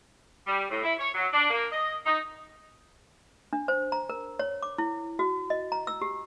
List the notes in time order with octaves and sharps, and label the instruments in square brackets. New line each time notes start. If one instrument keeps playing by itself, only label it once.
[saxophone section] G3
A2
E4
C#5
F#3
D4
A#3
D#5
D#4
[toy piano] D4
C5
A#5
A#4
C#5
D6
E4
F#4
D#5
A#5
E6
G4